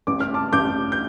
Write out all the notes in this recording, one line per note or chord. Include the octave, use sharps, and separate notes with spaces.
A1 D6
F6
A5 D6
A1 D6 G6
G6